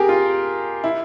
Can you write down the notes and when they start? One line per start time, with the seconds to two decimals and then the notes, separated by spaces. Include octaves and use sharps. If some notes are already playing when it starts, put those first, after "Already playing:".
Already playing: G4 G#4 A#4
0.09 F4
0.84 E4